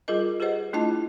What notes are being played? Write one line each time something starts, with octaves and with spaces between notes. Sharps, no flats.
G3 F4 G#4 A#4 D#5
G4 G#4 B4 C5 D#5 F#5
A3 D4 E4 F4 D#5 A5